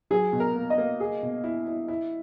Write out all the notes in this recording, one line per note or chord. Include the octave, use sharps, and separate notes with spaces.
F#3 G#4
B2
A#4
A#3
D#5
A#3
G#4
B2
E4
E4
E4